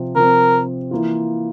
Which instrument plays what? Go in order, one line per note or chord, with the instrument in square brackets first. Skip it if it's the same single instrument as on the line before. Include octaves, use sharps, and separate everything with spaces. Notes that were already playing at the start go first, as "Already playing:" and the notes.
Already playing: [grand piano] C3 F3 C4
[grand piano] C3 F3 C4 [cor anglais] A#4
[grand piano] E3 A#3 F4